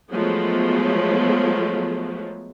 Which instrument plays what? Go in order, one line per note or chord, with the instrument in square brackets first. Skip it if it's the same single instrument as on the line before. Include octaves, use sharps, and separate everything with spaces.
[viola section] F3 F#3 G#3 A3 B3